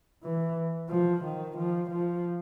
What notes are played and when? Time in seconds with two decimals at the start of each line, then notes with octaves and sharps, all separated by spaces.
0.23 E3
0.89 F3
1.24 D#3
1.57 F3
1.91 F3